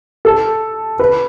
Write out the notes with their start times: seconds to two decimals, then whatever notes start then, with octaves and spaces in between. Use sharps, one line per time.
0.25 A4
0.99 B4